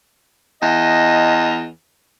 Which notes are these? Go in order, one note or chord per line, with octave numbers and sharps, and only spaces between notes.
E2 D#5